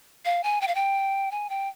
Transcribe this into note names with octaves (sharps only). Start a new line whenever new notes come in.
F5
G#5
G5
F5
G5
G#5
G5